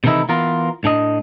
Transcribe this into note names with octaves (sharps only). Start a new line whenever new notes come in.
C3 D#3 E3 A3 D#4 E4
E3 B3 F4 A#4
A2 D4 D#5